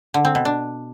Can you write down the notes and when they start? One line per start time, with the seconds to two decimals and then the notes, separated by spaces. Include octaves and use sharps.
0.14 D3
0.25 C4
0.35 B2
0.45 D4